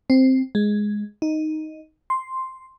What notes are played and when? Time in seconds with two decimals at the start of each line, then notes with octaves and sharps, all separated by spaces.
0.10 C4
0.55 G#3
1.22 D#4
2.10 C6